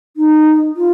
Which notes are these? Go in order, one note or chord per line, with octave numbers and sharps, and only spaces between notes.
D#4
F4